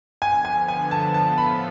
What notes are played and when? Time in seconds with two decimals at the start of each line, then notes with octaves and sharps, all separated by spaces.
0.22 D3 F3 B3 G#5
0.45 G#5
0.68 G#5
0.91 A5
1.14 A2 F3 B3 F4 A4 A5
1.38 B5